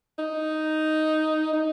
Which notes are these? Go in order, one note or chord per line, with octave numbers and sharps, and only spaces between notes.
D#4
D#4